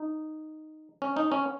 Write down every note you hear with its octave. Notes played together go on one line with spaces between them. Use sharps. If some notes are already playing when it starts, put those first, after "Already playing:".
Already playing: D#4
C#4
D#4
C#4